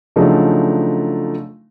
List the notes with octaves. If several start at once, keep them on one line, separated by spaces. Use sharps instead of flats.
C#3 F3 F#3 A3 D4 D#4